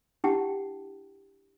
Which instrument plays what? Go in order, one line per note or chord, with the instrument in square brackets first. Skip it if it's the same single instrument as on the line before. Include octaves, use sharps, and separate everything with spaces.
[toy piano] D4 E4 G4 F#5 G5 A5